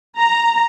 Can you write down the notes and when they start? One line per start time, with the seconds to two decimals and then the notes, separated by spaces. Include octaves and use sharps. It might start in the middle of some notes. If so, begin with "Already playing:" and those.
0.18 A#5